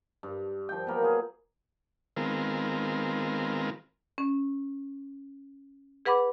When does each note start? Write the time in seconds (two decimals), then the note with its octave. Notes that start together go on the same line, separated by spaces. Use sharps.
0.23 G2
0.69 F3 G5
0.87 F#3 A#3 B3
1.02 F4 G#4
2.17 D#3 G#3 B3 C4 F4 A#4
4.18 C#4
6.05 G#4 B4 F#5 B5 D6